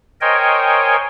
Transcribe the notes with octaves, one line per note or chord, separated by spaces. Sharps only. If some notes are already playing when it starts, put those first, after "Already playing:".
A#4 C5 C#5 D#5 G5 G#5